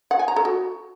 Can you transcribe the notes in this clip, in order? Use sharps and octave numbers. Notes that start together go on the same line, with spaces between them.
F#5
G#5
A#5
A4
F#4